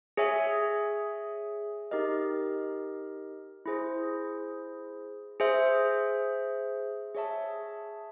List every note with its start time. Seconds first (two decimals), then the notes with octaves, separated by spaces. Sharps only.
0.17 G#4 C#5 E5 G#5
1.91 D#4 G4 A#4 D#5
3.66 E4 G#4 C5
5.40 G#4 C5 E5
7.15 G#4 C#5 E5 A5